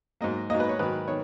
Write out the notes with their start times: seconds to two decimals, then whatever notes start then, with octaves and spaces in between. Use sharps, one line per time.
0.21 G#2 F#3 A#3 D#5
0.50 G#2 F#3 A#3 D#5
0.60 B4
0.69 C#5
0.79 G#2 D#3 F#3 B4
1.08 D#3 C#5